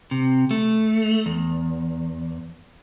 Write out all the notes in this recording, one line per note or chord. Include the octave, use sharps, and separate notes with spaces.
C3
A3
E2